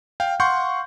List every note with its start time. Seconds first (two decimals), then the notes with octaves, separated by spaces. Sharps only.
0.20 F5 G5
0.40 F5 F#5 C6 C#6 G6